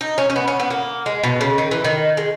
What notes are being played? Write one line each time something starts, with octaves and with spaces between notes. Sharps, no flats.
D#4
C#4
C#4
B3
C#4
B3
A#3
G#3
B2
C#3
D#3
E3
D#3
G#3